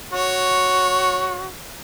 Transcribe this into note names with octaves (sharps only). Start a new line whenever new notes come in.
F#4 C#5